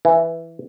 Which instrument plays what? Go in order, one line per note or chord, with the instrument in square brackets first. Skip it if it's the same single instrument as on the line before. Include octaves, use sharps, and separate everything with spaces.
[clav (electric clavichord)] E3